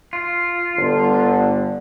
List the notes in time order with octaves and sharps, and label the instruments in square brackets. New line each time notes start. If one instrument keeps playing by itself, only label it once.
[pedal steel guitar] F4
[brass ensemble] G1 D3